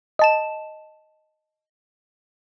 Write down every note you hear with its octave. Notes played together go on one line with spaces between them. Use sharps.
D#5 A5 E7